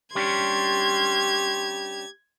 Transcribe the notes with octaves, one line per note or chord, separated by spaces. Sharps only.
G3 C#4 D4 G4 C6 G#6